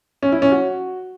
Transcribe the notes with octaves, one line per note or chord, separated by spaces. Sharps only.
C#4
E4
C#4
F#4